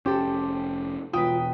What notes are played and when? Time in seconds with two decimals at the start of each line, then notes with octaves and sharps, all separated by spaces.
0.06 F1 C#4 G4 A4 C5
1.13 E1 F4 B4 G5 D#6